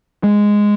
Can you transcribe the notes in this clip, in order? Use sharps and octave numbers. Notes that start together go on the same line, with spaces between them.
G#3